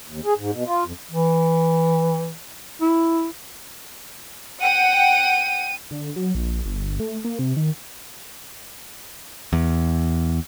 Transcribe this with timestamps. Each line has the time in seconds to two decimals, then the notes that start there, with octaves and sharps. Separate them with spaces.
0.08 D#2
0.25 G#4
0.38 G#2
0.52 B2
0.66 F4
0.85 F2
1.12 E3
2.82 E4
4.62 F#5 G5 D#7
5.91 D3
6.16 F#3
6.35 A#1
6.65 G1
7.00 A3
7.25 A#3
7.39 C3
7.57 D#3
9.53 E2